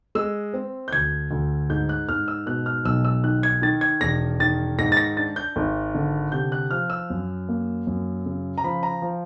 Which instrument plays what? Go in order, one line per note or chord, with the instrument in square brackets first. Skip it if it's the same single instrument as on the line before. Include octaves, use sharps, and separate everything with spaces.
[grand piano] G#3 E6
C4
G6
D2 G#6
D2
G#2 G6
F#6
G#2 F6
E6
B2 F#6
F6
B1 E6
E6
D#3 F#6
G#6
D#3 A6
G#6
E1 A#6
D#3 A6
G#2 A#6
A6
A#6
D4 A6
G6
G#1
D3
C3 G6
F#6
F3 F6
E6
F#2
A#3
F#2
C#3
A#5
F3 B5
A#5
F3